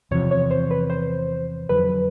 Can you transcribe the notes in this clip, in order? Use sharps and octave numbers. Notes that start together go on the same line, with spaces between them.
E2 C3 F3 C#5
C#5
C5
B4
C5
F2 D3 F#3 B4